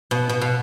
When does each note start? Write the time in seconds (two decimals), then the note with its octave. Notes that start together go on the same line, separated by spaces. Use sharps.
0.11 B2
0.29 B2
0.41 B2